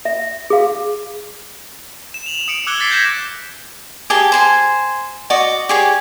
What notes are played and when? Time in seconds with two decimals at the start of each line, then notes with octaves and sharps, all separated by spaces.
0.05 E5
0.50 G#4 F5
2.14 E7
2.26 F7 F#7
2.48 D#6 C#7 D7
2.67 D6 E6 F#6 G#6 C#7 G7
2.79 D6 A6 B6 C7 D7
2.91 G6 G#6 A#6 B6 E7
4.10 G4 G#4 G5 A5
4.32 C5 G#5 C6
5.30 F#4 D5 D#5 C#6
5.69 G4 G#4 C#5